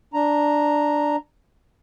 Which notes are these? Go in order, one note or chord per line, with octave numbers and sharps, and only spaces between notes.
D4 A#5